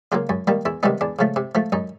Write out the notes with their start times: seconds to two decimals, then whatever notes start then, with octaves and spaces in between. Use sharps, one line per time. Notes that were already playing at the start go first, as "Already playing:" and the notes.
0.12 C#3 F#3 A#3 F4
0.29 F#2
0.47 D#3 G3 A#3
0.65 E2 E4
0.83 C3 D#3 G3 B3 D#4
1.01 E2 D4
1.19 C#3 F3 A3
1.36 C3
1.55 F3 A3
1.72 F#2 D#4